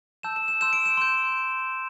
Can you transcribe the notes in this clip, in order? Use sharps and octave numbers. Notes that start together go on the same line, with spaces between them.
A5 E6 G6 E7
E7
E7
C6 E6 G6 E7
D7
E7
C6 G6